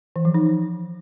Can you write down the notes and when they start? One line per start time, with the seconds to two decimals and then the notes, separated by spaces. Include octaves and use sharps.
0.16 E3
0.25 F3
0.34 D#4